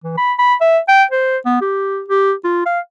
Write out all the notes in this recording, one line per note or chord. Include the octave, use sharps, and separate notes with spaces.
E3
B5
B5
E5
G5
C5
B3
G4
G4
F4
F5